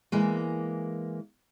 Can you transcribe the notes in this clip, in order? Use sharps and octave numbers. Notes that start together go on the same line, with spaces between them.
E3 G#3 A#3